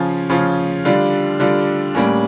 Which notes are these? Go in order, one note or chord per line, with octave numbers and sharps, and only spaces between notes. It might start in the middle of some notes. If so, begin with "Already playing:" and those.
Already playing: C#3 F3 C#4 F4
C#3 F3 C#4 F4
D3 G3 D4 F4
D3 G3 D4 F4
A2 G3 A#3 C#4